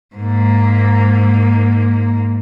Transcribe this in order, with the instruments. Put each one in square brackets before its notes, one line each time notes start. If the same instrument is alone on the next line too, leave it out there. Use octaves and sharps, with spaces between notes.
[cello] G#2 A#3